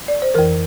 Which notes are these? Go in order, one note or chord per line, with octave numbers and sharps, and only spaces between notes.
D5
C5
F2 E3 A#4